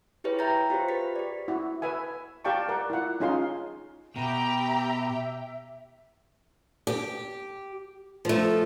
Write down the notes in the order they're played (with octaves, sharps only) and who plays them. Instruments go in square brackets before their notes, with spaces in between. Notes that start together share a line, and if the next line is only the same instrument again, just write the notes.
[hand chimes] E4 G4 G#4 B4 C#5
E5 G5 A#5 G6 A6 A#6
F4 G4 G#4 C5
G4 B4 A6 B6
G4 D5
[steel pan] E4 F#4
B4 E5 G#5
G4 D5 F5 G5 A5 C#6
A#4 D5 F#5
E4 F4 F#5
C#4 D#4 F4 G#4 F5 C6
[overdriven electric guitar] B2 [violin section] G4 G5 [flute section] E5 [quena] A#5
[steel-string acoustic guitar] G4
F3 A3